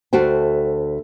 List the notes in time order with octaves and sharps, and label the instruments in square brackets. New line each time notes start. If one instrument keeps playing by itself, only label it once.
[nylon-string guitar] D2 A3 F#4 C5 G5